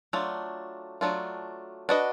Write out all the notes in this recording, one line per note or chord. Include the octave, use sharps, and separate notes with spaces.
F#3 A3 D4 F4
F#3 A3 D4 F4
D4 F#4 B4 D#5